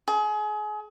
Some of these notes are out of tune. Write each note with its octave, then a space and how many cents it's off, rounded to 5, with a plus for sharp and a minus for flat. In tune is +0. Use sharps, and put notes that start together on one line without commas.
G#4 +30